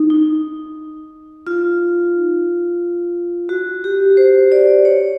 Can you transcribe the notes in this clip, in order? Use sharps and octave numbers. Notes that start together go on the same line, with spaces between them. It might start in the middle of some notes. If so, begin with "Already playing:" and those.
Already playing: D#4
D#4
F4
F#4
G4
C5
D5
C#5